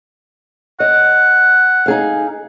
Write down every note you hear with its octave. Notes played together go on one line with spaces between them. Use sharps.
D#5 F#5
D#4 G#4 F5